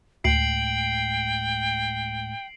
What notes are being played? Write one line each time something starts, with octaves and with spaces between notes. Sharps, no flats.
D2 A2 G#3 G5 C7 D7 F#7